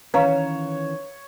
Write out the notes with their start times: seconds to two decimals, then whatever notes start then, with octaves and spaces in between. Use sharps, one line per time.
0.14 D#3 E3 C#4 B4 C#5 F5 A#5